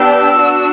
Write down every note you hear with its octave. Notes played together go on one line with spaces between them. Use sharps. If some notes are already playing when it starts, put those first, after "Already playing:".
Already playing: B3 D4 G4 E6
D4 F#4